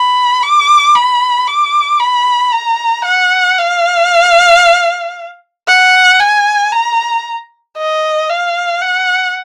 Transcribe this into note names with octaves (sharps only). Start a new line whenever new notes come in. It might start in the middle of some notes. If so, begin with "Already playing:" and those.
Already playing: B5
D6
B5
D6
B5
A#5
F#5
F5
F#5
G#5
A#5
D#5
F5
F#5